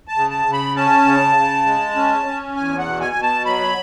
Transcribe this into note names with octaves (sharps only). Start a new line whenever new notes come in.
A5
C#3
A5
C#3
B5
C#4 A5
C#3
C#3
G#3
C#4
C#4
E2 G#5
F#5
B2
G#5
B2
A5
F#3 B5